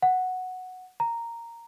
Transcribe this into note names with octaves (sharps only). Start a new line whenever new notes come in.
F#5
A#5